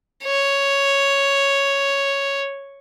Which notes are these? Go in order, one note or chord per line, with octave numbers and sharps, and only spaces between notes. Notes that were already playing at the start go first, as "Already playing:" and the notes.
C#5